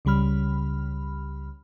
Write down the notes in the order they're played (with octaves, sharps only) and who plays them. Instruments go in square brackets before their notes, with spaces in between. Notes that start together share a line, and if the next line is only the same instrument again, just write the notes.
[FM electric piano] C#2 C#3 G3 B5 F6